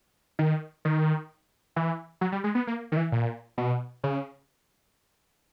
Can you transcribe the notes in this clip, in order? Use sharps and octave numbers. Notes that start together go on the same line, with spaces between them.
D#3
D#3
E3
F#3
G3
G#3
B3
A#3
D#3
E3
A#2
B2
C#3